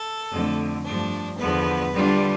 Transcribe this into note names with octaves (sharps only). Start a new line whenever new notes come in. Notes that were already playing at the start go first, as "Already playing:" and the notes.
Already playing: A4
F2 D3 A3
G2 F3 A3 D4
E2 D3 F3 B3 B4
D3 G3 D4 F4